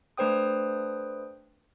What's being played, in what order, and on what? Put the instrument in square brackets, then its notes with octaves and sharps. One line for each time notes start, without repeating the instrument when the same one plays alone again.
[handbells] A3 D4 B4 C5 G5 D#6